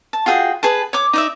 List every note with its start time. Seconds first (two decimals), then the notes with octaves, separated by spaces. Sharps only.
0.13 A5
0.26 F4 F#4 G#4 G5
0.63 G#4 B4 A5
0.93 C#5 D6
1.13 D#4 D5 E5